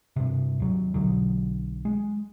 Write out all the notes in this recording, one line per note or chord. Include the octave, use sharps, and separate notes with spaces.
G2 C3
D#2 F#3
B1 B2 D3 F#3
G#3